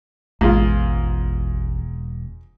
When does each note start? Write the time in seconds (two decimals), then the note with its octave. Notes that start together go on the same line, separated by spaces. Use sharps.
0.41 E1 A1 G#2 B3 F4